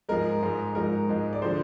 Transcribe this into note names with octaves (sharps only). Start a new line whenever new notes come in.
G#2 F3 G#3 A#4
G#2 F3 G#3
G#2 F3 G#3 A#4
G#2 F3 G#3
D5
D3 F3 C5